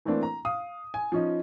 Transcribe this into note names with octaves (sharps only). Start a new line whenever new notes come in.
E3 A3 A#3 C4 D4
A#5
F5 D#6
G#5
F3 C#4 D#4